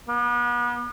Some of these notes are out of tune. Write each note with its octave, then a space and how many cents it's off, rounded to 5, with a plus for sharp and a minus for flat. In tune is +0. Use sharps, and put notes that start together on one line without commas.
B3 -35